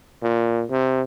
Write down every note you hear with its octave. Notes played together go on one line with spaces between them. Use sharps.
A#2
C3